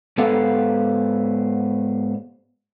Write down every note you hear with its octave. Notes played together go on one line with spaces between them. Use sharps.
G#2 B3 G4 A4 B4 F5